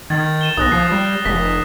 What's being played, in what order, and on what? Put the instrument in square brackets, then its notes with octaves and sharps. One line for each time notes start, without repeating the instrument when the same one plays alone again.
[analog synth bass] D#3 [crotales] G#6 A6
[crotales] D#7 E7 G7
[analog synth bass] B1 [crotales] D#6 F#6 A#6
[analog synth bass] F3 [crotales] A6 C7
[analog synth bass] G3
[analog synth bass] F1 [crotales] B6